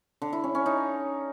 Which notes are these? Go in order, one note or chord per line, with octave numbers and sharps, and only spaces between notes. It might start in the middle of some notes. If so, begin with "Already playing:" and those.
D3
E4
C#4
C#4
D#4